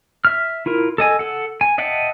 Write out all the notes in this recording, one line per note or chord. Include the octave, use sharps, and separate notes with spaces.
E5 F6
E4 F4 A#4
A4 D#5 G#5
A4 F#5
G#5
D#5 E5 F#5 G5 A5